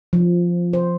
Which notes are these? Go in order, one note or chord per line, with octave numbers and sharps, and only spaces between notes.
F3
C5